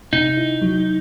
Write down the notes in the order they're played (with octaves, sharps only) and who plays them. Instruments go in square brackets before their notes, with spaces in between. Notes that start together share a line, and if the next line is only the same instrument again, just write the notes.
[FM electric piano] C3 [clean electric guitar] D#4
[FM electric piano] E4
F#3